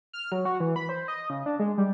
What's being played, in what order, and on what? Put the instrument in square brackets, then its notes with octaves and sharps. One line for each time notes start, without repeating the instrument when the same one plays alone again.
[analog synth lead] F6
F#3
F#4
E3
B5
C5
D#5
C#3
D4
G#3
G3